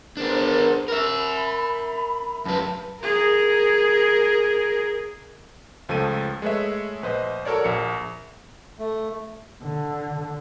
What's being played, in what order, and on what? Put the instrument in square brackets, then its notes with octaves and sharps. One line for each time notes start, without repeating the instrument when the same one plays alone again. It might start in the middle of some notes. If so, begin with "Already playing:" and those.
[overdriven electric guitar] B3 D4 [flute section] G#4 A#4 C5
[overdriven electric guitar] A#4 E5 [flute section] B5
[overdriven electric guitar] F#2 B4 [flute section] F4 A5
[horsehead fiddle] G#4 A#4
[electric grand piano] C#2 F3 A3 A4 D#7
G#3 A3 B4 C#5 E5
A#1 B4 C5 D#5
F#4 A4 A#4 C#5 D5
A#1 A#3 C#7
[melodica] A3
[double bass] D3